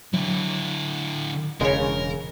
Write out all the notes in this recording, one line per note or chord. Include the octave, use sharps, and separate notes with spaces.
D3 F#3 E4
E1 C#3 G#3 A#4 C#5